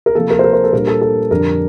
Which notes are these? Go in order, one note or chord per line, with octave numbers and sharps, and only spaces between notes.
A#4
C3 F3 A#3 A4
A#4
C5
A#4
C5
A4
A#2 G3 D4 A#4
A4
A4
F2 D3 G3 D4 A#4